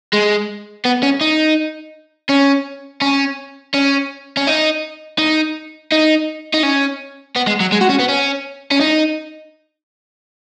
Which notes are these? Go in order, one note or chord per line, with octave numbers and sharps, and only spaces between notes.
G#3
B3
C#4
D#4
C#4
C#4
C#4
C#4
D#4
D#4
D#4
D#4
C#4
B3
G#3
F#3
G#3
F#4
C#4
B3
C#4
C#4
D#4